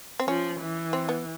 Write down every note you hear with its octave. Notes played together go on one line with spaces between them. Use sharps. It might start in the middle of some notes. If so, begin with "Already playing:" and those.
C4
F3 C#4
E3
C4
B3